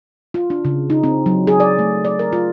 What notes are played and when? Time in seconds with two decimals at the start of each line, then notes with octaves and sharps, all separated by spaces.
0.34 F4
0.50 D4
0.65 C#3
0.90 D#4
1.03 C4
1.26 F#3
1.47 G#4
1.60 D5
1.79 A3
2.05 D5
2.19 A#4
2.33 F4